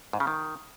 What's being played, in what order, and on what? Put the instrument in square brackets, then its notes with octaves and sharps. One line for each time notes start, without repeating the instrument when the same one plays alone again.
[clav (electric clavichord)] G#2
C#3
D#3